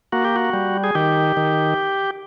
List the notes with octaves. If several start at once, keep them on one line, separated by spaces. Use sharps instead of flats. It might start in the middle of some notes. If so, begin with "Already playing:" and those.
A#3 F#4
G4
F#4
G3
G#4
D#3 G4
D#3